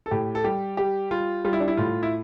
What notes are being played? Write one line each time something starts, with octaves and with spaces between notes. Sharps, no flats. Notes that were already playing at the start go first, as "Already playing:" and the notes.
A4
A2 G4
A4
G3 G4
G3 G4
G3 F4
G3 F4
E4
D4
E4
A2 F4
E4